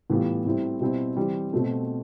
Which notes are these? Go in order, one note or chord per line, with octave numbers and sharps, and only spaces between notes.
A2 E3 G3 B3 F4
A2 G3 C4 E4
B2 G3 C4 E4
E3 G3 C4
B2 A3 C4